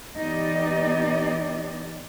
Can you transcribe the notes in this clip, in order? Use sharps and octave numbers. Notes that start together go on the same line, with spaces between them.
E3 B3 D#4 G4 D5 D#5